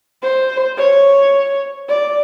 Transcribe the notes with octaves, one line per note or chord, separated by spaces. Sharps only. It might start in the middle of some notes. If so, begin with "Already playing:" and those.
C5
C#5
D5